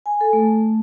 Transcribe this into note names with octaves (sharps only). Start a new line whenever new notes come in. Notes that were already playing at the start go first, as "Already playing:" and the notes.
G#5
A4
A3